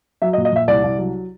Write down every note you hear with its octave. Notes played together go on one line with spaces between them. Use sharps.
F#3 E5
D#5
A#2
D#5
A#2 E5
C2 D5
C2
F#3